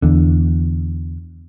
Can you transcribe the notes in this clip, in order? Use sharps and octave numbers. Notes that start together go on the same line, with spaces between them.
E2 D3